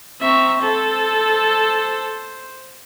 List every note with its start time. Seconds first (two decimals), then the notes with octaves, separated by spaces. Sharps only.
0.21 C4 E5 A#5 C#6
0.62 A4 C5